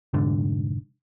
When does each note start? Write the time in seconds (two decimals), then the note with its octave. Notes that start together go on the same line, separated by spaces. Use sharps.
0.14 F1 G#2 D3